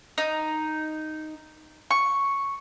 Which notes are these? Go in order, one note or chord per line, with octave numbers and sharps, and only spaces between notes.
D#4
C#6